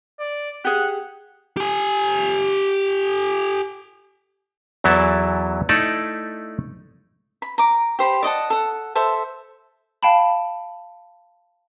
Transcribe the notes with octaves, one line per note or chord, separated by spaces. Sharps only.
D5
G4 G#4 F#5
G4 G#5
E2 E3 F#3 E4 A4 A5
A3 D#4 E4 A4 D5
B5
A#5 D6
G4 C5 B5
D5 D#5 F#5 A5
A4 F#5
A4 C5 E5
F5 G5 A5 B5